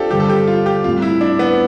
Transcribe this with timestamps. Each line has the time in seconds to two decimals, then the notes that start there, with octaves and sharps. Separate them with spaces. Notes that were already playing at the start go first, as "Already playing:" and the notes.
Already playing: C4 D4 F4 G4 A4
0.10 G2 D3 G3 G4
0.20 A4
0.29 G4
0.47 F4
0.66 G4
0.83 A2 G3 C4 F4
1.02 E4
1.21 D4
1.39 B3